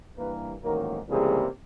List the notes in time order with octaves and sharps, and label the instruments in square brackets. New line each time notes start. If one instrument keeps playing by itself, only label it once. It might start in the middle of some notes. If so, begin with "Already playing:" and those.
[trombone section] G2 E3 G3 A#3 B4
A1 G#2 D#3 F#3 A#3 A#4
C#2 C3 E3 G3 A#3 G#4